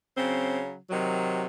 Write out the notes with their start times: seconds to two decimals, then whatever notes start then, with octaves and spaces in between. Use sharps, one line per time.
0.16 C#3 F#3 C4
0.90 C3 D#3 F#3